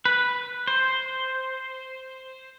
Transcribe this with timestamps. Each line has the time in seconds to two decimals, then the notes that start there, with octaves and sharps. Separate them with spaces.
0.05 B4
0.68 C5